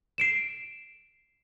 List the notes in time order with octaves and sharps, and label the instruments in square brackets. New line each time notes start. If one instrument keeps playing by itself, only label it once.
[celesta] C7 D7 E7